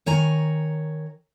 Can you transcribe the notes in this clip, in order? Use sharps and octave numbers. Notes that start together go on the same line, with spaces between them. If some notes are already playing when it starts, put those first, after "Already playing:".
D#3 C#5 G#5 A#5